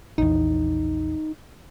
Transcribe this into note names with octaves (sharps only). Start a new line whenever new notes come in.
A#1 E2 D#4